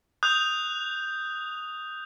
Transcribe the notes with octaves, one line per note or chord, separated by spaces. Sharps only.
D#6 F#6 G6 F7